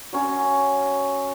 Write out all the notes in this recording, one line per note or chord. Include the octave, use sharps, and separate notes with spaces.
F#3 C#4